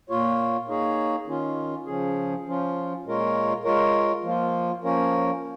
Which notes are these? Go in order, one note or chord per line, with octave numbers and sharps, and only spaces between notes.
A#2 A#3 F4 C#5
A#3 D#4 G#4 C#5
D#3 C#4 F4
C#3 F3 C#4 G#4
F3 C#4 F4
A#2 G#3 F4 A#4 C#5
G#3 F4 A#4 C#5
F3 A#3 F4
F3 A#3 C#4 A#4 C#5